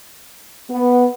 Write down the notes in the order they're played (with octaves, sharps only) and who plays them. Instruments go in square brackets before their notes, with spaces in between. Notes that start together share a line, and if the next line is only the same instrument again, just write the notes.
[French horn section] B3